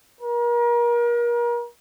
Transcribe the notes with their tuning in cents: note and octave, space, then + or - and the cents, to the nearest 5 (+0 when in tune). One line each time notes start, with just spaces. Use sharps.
A#4 +35